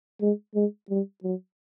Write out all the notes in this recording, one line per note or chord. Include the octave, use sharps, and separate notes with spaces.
G#3
G#3
G3
F#3